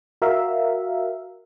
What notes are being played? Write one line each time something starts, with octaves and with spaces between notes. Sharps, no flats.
F#4 A#4 E5 F5